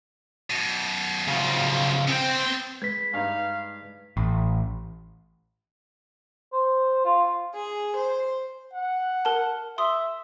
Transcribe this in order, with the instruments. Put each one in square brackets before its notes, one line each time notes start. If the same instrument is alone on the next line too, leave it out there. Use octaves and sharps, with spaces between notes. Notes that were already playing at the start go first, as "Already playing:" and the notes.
[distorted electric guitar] F#2 B2
[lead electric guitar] C#3 F3
[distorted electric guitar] B3 G5 [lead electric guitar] C4
[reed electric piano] G#3 B4 [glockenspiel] G#6 B6
[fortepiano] G2 D#4 [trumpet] F5
[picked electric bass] A1
[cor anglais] C5
F4
[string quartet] G#4
C5
[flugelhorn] F#5
[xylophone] A#4 A5
[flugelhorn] E5 [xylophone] C6 D#6